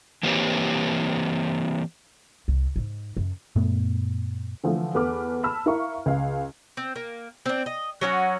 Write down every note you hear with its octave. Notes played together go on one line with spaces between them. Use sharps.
E3 A#3 C4 G4 B4 C#5
C2
G#2 D#4
F#2
F#2 A#2 A3 B3
D3 E3 F3 A3
E2 A4 B4 D6 F6
A5 B5 E6 F6
E4 A#4 E5 F5 C#6
C#2 F5
C4
A#3
C4 D4
D#5
F#3 C#4 F#4